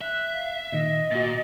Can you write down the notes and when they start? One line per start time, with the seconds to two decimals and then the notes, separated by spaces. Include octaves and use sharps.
0.01 E5 F#6
0.33 F5
0.72 A#2 D#3 D#5
1.11 A#2 F#4 A6